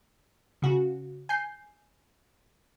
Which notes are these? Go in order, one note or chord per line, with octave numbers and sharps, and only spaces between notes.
C#3 F#4
G#5 G6 C7